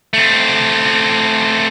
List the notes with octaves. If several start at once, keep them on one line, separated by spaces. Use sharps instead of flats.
A3 C4